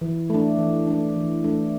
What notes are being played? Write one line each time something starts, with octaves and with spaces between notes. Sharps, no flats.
E3
A3 D4
E3
A3 D4
E3
A3 D4